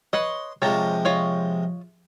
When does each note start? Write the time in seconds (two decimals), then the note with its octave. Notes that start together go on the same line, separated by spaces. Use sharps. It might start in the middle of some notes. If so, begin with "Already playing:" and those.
0.13 B4 C#5 D#5 C6
0.62 C3 F3 G#3 C#5 A5 A#5
1.05 F4 C#5 D#5